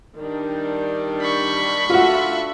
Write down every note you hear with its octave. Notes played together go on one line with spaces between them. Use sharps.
D#3 G3 D4
B5 C#6
A3 D4 F4 F#4 E5